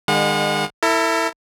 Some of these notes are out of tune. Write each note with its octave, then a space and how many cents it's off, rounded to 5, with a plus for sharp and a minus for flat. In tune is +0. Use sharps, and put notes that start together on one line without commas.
D#3 -45 G#3 -35 F#5 -40
E4 +0 A4 +45